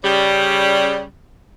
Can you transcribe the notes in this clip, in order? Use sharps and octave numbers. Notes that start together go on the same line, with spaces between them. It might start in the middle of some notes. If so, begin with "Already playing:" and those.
C#3 G3